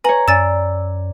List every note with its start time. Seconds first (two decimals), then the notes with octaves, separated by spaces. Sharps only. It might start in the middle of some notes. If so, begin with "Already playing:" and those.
0.04 B4 C#5 G#5 A#5 F#7
0.28 F#2 D5 G#5 E6 A6 E7